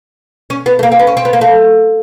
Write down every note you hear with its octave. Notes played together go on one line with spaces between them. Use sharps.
C#4
B3
A3
A#3
C4
B3
C#4
C4
B3
A#3
A3